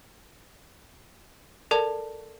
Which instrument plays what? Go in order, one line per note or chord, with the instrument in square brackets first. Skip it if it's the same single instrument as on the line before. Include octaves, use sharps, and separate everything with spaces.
[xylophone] A4 D5 A5 [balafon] A#4